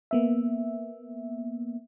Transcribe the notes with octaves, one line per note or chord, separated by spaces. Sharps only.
A#3 B3 E5